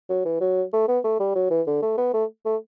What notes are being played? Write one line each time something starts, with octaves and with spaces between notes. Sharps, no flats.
F#3
E3
F#3
A3
B3
A3
G3
F#3
E3
D3
A3
B3
A3
A3